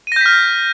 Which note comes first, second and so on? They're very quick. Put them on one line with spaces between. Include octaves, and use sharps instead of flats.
D#7 A#6 G6 B6 F6